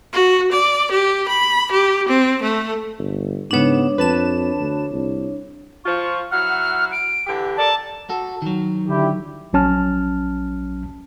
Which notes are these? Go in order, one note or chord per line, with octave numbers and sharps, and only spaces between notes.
F#4
D5
G4
B5
G4
C4
A3
G1
G#2 C#3 B3 D4 C#5 E7
F2 B4 A5 E7
D2
C2
F3 F4 C#6
F#3 E4 F#5 F6
D7
D3 E3 G4
A4 A#4 D5 A5
F#4 A4
D#3 F#3
D3 E4 G4
A#1 F#3 C#4 A5 F6